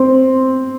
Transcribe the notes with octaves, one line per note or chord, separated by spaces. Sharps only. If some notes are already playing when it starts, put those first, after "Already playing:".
Already playing: C4